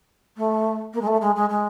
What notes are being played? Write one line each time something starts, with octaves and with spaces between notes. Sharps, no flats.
A3
A#3
G#3
A3
G#3
G#3
G#3